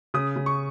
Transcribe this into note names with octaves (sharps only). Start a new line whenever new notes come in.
C#3 D#6
C#3
C#6